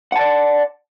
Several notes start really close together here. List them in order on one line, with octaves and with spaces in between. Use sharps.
F#5 A5 D5